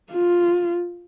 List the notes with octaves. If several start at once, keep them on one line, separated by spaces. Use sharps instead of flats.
F4